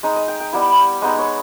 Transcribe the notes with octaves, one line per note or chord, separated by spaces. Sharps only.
G#3 D#4 D#5
D#5
G5
G5
G3 B3 E4
G#3 B3 D#4 D#5
C#5